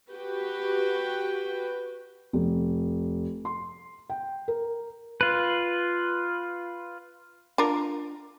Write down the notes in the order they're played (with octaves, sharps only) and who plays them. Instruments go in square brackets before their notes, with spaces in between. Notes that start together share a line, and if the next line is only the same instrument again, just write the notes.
[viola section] F#4 G4 B4 G5
[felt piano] F1
C6
G5
A#4
[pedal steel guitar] F4 B4
[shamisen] D4 F4 A#4